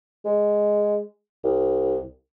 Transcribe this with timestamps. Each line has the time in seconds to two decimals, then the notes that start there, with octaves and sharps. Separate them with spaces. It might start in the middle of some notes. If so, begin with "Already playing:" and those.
0.25 G#3
1.44 C2